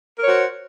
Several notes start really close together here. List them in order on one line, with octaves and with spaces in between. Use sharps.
A#4 C#5 F#4 C5